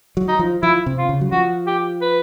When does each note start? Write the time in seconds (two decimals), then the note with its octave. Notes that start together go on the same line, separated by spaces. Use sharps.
0.17 F#3
0.28 D#4
0.39 F3
0.63 F3 E4
0.86 C3
0.98 F4
1.09 C#3
1.21 F#3
1.32 F3 F#4
1.67 G4
2.02 B4